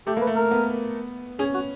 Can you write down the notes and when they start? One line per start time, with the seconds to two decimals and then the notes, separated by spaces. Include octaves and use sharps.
0.07 A3 G4
0.17 A#3 B4
0.27 A3
0.36 A#4
0.51 B3
1.39 C#4 G#4
1.54 F#4